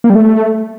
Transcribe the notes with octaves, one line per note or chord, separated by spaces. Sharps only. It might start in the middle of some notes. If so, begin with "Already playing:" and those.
A#3
G3
A3